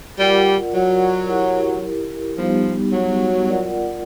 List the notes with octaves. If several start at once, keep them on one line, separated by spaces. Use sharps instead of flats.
G3 F4 A#4 D5 F#5
F#3
E4 G4 A#4
F3 G3 B3 D#4 G4
F#3
F4 A#4 D5 F#5